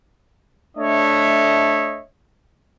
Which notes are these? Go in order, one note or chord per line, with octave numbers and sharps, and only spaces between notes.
A3 D4 C#5 D#5 E5